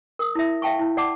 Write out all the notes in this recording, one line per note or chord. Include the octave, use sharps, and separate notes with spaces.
A#4 D#6
E4 E5
E5 F5 G5 A5 C#6
E4
D5 F#5 A5 D6